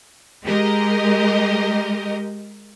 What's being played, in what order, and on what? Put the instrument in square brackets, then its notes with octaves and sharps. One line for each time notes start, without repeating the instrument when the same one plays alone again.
[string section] G#3 G4 A#4 D#5